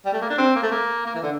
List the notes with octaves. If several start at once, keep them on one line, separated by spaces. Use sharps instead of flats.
G3
A3
A#3
D4
C4
A#3
A3
A#3
A#3
E3
D3